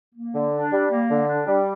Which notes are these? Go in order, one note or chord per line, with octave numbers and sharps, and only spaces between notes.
A#3
D3
D4
G3
A#3
D3
D4
G3